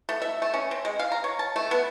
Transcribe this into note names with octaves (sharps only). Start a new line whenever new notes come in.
A3
E5
A3
C#4
C4
G#3
F5
A#5
C#5
A5
A3
B3